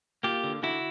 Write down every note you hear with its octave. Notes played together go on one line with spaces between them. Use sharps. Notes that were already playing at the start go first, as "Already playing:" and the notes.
A#3 F4 G4
D3
D3 E4 F#4